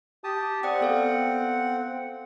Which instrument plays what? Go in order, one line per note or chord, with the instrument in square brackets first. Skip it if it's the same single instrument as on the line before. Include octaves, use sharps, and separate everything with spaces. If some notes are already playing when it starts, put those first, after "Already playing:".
[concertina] G4 A5 D#6
[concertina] C4 F#5 [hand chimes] D5 G5 D#6
[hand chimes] B3 A4 F5